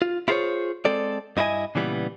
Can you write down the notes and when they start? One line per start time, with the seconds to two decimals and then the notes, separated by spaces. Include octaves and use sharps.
0.02 F4
0.28 E4 F4 G#4 A4 C5 C#5
0.85 G#3 C4 A4 D5
1.37 G2 D#4 E4 F#4 D#5 G#5
1.75 A#2 C#3 E3 G3 B3